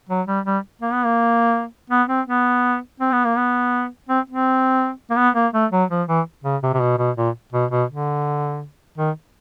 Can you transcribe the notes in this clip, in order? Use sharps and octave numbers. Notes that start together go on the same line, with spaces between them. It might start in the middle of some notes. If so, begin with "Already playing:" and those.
F#3
G3
G3
A#3
B3
A#3
B3
C4
B3
C4
B3
A#3
B3
C4
C4
A#3
B3
A#3
A3
F#3
F3
E3
C#3
C3
C3
B2
B2
A#2
B2
B2
D3
D#3